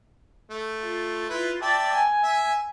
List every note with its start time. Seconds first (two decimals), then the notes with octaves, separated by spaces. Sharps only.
0.51 A3
0.82 F4
1.30 E4 F4 B4
1.62 D5 E5 G5 A5
1.93 G#5
2.24 E5